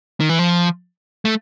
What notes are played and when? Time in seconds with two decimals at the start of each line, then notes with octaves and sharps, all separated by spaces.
0.20 D#3
0.29 E3
0.39 F3
1.25 A3